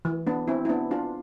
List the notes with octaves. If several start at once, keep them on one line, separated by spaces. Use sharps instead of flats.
E3
B3 D4
C4 E4
E4
B3 D4
D4 F4